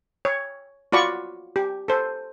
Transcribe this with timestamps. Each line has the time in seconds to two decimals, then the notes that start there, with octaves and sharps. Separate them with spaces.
0.25 C#5
0.92 F4 F#4 D5 B5 C#6
1.56 G4
1.88 A4 C5